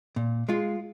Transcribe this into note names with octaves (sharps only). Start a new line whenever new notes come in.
A#2
G#3 F4